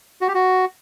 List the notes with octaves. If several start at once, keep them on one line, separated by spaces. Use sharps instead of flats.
F#4
G4
F#4